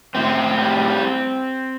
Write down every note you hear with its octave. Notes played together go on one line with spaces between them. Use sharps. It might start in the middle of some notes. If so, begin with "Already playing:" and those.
A2 C4
G3